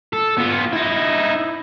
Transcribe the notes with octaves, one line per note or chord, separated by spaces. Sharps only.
A4
B3 F4
D#4 E4